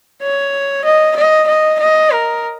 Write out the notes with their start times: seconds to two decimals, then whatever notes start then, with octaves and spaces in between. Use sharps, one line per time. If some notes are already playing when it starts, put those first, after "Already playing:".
0.22 C#5
0.85 D#5
1.16 D#5
1.48 D#5
1.80 D#5
2.11 A#4